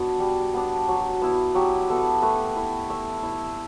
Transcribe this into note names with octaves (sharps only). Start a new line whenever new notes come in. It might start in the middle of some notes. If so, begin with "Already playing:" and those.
Already playing: B3 D4 F#4
G3
B3 D4
F#3
B3 E4
F#3 G4
B3 E4 A4
A3 B4
E4 B4
A3 E5
E4 E5